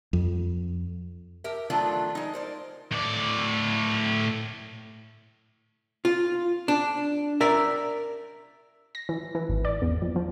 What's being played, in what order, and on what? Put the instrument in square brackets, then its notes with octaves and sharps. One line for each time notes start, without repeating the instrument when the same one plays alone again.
[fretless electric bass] F2
[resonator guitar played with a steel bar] G4 A#4 E5
D#3 F3 F#3 A3 D4 F4
G#3 D#4
A#4 C5 D5
[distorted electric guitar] A2 D5
[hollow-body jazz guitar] F4
D4
A#4 D5 E5
[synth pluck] A#6
E3
E3
G#1
D5
E2
F2
F3